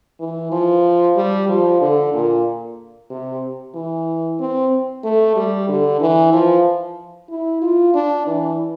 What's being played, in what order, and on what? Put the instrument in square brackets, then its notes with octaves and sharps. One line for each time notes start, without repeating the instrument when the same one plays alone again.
[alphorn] E3
F3
G3
F3
D3
A#2
C3
E3
C4
A3
G3
D3
E3
F3
E4
F4
D4
E3